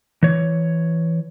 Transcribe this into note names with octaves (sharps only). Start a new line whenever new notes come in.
E3 C#5